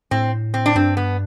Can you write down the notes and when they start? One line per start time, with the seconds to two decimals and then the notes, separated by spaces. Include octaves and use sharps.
0.11 A2 C4
0.54 C4
0.66 D4
0.76 G2 C4
0.97 B3